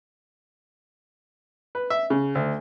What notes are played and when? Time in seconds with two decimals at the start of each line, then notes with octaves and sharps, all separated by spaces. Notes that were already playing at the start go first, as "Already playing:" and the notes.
1.75 B4
1.90 E5
2.10 C#3
2.35 D2